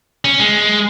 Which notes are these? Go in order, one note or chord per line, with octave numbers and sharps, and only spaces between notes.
C#4
G#3